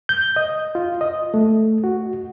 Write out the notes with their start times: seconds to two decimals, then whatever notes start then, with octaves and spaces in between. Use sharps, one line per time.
0.09 G6
0.36 D#5
0.75 F4
1.01 D#5
1.34 A3
1.84 F#4